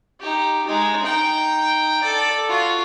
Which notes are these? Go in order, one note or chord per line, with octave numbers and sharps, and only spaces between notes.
D#4 G4
G#3 D#4
D#4 G5
A4 D5
F4 F#4